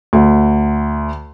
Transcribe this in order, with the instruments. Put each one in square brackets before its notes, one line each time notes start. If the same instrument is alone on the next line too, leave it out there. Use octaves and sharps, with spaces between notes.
[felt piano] D2